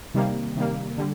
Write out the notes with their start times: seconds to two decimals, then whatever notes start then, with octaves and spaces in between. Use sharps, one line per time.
0.14 C3 D#3 G3 A#3
0.56 C3 D#3 G3 A#3
0.97 D3 G3